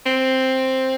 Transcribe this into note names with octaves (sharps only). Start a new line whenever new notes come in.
C4